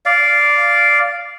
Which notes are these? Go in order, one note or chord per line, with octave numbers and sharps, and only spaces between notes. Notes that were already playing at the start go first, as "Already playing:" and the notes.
D5 F5